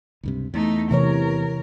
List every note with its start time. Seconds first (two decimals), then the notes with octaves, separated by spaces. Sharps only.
0.24 C#2 G2 C3
0.54 E2 A3 D#4
0.91 C3 E3 A#4 C#5